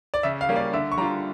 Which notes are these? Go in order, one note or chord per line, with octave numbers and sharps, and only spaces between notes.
D5
C#3 E5
F5
G3 A#3 C#4
D5
D3 E5
C#6
G3 D4 F4 A#5